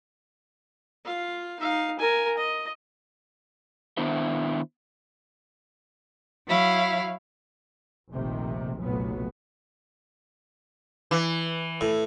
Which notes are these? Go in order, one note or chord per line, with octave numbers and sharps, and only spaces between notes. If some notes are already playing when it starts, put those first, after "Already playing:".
F4 F5
D#4 F5
A#4 G#5
D#5
D#3 B3 D4 E4 C5 E5
F#3 E4 F5
F1 A#1 C3 D#3
F1 B1 A#2 F#3 B3
E3
A2